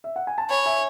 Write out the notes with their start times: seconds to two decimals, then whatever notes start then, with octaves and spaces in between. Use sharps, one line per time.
0.04 E5
0.16 F#5
0.27 G#5
0.38 A5
0.49 C#5 G#5 B5
0.66 E5 G#5